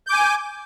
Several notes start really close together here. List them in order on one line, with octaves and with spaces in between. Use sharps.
G6 D6 G#5